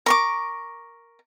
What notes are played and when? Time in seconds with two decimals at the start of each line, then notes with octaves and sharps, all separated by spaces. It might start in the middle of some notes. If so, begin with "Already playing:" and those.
0.06 A#4 C#6 D6